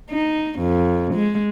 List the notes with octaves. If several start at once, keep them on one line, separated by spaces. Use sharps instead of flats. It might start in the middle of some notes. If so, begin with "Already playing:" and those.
D#4
F2
G#3